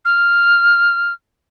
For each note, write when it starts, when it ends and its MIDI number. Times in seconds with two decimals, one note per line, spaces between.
0.05 1.12 89